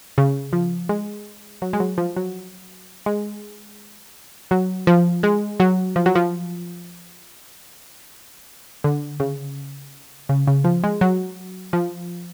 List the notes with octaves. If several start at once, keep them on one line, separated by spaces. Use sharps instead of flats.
C#3
F3
G#3
F#3
G#3
F#3
F3
F#3
G#3
F#3
F3
G#3
F#3
F3
F#3
F3
D3
C#3
C#3
C#3
F3
G#3
F#3
F3